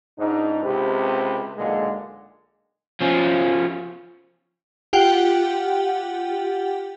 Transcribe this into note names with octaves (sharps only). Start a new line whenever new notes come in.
C#2 G#2 D4 D#4
C#2 C3 C4 G4 B4
B1 A#2 D3 G#3
F3 C#4
F4 G4 F#5 G5